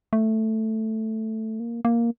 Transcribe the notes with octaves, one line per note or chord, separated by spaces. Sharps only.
A3
A#3
A#3